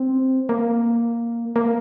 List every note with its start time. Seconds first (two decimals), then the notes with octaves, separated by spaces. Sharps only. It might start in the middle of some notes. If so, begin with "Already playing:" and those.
Already playing: C4
0.49 A#3
1.56 A#3